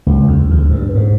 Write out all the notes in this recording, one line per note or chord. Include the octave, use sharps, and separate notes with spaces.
C#2
E2
D2
G2
G#2